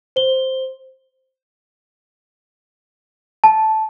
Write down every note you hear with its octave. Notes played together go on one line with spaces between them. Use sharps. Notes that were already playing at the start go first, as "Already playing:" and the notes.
C5 G7
A5